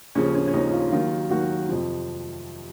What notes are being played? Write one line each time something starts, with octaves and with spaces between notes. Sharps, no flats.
D#2 C#3 F3 C#4
C#4
C#4
D#2 C#3 F3 D#4
F4
D#2 D#3 F#3 F4
D#2 D#3 F#3 F#4
F2 C3 F3